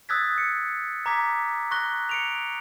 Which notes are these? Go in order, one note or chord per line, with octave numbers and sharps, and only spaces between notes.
D#6 E6 F#6 G#6 A6 B6
C#7
A#5 D6 G#6 B6
C#6 F#6 A#6 G7
C#7 D7 F7